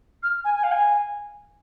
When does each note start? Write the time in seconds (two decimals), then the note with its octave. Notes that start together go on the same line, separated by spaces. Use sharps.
0.23 F6
0.44 G#5
0.55 G#5
0.63 F5
0.71 G#5